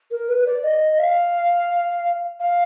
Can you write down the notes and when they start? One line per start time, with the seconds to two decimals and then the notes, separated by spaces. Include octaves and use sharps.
0.11 A#4
0.28 B4
0.46 D5
0.63 D#5
0.99 F5
2.40 F5